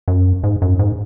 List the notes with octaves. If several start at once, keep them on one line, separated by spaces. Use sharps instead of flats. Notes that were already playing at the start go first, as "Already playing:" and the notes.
F#2
G#2
F#2
G#2